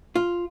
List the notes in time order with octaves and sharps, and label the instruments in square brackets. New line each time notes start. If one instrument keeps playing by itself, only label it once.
[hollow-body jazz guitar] F4